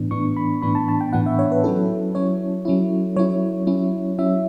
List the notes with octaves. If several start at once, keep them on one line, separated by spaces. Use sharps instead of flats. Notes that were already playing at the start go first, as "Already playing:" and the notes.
Already playing: A2 E3 B3 D4
A2 E3 B3 D4 C#6
B5
A2 E3 B3 D4 B5
A5
A5
G5
A2 E3 B3 D4 F#5
E5
C#5
B4
F#3 C#4 E4 A4
F#3 C#4 E4 C#5
F#3 C#4 E4
F#3 C#4 E4 C#5
F#3 C#4 E4
F#3 C#4 E4 E5